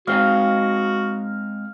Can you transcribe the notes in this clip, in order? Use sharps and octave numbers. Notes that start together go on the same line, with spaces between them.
G#3 C4 D#4 F#4 F5